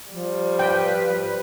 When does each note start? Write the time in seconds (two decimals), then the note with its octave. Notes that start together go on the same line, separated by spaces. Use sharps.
0.11 F3 G3
0.59 B4 G5